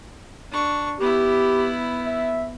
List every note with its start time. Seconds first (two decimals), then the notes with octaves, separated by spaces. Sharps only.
0.51 D4 C#6
1.00 B3 E4 G4
2.06 E5